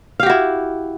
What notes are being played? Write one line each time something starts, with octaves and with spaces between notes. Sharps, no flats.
E4 F#4 G4 F5